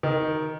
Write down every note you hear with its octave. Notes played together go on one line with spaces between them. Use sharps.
D#3